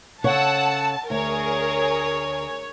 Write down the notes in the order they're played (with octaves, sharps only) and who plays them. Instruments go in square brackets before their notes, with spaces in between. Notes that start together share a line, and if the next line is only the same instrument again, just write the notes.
[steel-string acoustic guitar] C#3 A4 C#5 [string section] F#5 E6 [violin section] A5
[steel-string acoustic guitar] D2 [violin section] G#4 A#4 [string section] C#5